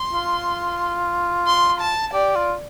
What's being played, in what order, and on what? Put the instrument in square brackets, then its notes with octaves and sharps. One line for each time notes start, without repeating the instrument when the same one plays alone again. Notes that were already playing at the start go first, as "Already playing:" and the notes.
Already playing: [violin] C6
[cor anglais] F4
[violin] C6
A5
[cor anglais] G4 [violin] D5
[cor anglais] F4